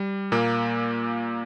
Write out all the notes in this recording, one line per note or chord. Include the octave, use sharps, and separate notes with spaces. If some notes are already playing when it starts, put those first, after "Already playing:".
Already playing: G3
A#2 A#3